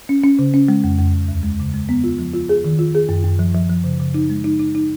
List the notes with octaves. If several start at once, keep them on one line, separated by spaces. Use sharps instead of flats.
C#4
C#4
C#3
C#4
G#3
F2
F2
F2
D#2
G#3
C#3
G#3
B3
F4
F3
F4
G#4
D#3
F4
G#4
F#2
F#2
F3
F3
F3
C#3
C#3
D#4
G#3
D#4
D#4
D#4